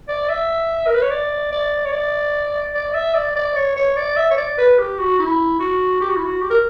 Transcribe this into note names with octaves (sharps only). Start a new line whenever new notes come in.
D5
E5
A#4
B4
C#5
D5
D5
C#5
D5
D5
E5
D5
D5
C#5
C#5
D5
E5
C#5
D5
B4
G4
F#4
E4
F#4
G4
F#4
E4
F#4
G4
A#4